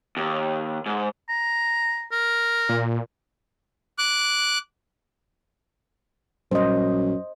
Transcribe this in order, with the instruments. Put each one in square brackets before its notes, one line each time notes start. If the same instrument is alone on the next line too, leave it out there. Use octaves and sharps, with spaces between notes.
[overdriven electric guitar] D#2
G#2
[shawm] A#5
A#4
[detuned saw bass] A#2
[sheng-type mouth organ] D6 F#6
[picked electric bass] A#1 G3 [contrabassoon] F#2 [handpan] C5 D#5